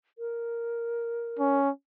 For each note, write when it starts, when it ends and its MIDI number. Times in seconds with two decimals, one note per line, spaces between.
0.18 1.58 70
1.39 1.70 61